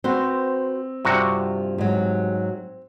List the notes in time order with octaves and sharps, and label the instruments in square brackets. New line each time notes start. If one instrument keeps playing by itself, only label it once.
[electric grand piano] C4 [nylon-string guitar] F#4 B4 C5
[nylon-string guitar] G2 F3 [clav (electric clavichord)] C3 F#4
[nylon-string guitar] G#2 F#3